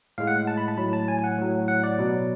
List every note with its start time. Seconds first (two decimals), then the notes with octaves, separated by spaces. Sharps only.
0.18 A2 G#3 F5
0.27 F#5
0.47 A5
0.58 B5
0.68 A5
0.78 A2 F#3 B5
0.93 A5
1.08 G#5
1.19 G#5
1.24 F#5
1.38 A2 F#3
1.68 F#5
1.83 D5
1.98 B2 F#3